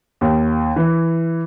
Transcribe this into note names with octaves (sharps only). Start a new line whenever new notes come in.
D#2
E3